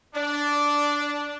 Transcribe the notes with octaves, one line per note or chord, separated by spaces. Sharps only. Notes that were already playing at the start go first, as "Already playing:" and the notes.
D4